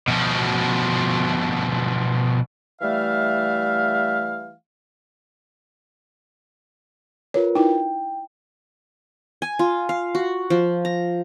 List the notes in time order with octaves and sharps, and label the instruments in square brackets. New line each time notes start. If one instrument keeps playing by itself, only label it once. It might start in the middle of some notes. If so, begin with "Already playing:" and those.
[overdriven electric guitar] B2 F3
[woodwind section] E3 G3 A3 E5 F5
[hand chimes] F4 A#4 B4 [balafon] C#5
[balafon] D#4 E4 [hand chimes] G5
[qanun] G#5
F4
F5
F#4
F3
A#5